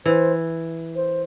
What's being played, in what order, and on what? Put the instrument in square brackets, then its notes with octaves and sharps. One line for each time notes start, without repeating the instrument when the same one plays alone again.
[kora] E3 [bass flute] C5
[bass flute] C5